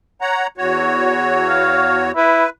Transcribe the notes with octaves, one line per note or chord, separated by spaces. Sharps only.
C#5 F#5 A#5
E2 F#4 C#5
F5
E4 B4